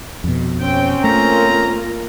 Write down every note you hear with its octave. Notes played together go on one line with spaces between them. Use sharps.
F2 B2
C4 C#4 G5
A3 A#3 F4 A#5